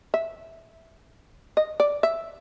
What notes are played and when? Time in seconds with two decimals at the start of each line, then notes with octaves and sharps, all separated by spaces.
0.14 E5
1.57 D#5
1.80 D5
2.03 E5